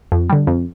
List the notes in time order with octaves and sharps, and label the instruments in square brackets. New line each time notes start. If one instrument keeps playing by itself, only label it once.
[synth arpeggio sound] F2
D3 G3
F2